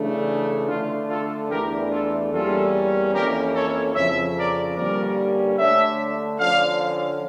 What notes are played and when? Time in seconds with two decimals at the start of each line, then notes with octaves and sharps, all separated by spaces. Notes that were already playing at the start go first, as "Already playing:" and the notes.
Already playing: C#3 E3 A3 D4
0.68 D3 A3 D4 F4
1.09 F4 A4
1.50 E2 E3 A3 D4 G4 A#4
1.90 F4 A4
2.31 E2 E3 G3 A#3 C#4 F4 A4
3.12 F2 E3 A#3 C#4 G4 A#4
3.54 A4 C#5
3.94 F2 C#3 F3 C#5 E5
4.35 A#4 D5
4.76 G2 D3 G3 A#3 C#4 A#4 D5
5.57 D3 A3 D4 C#5 E5
6.39 D3 F3 C#4 D5 F5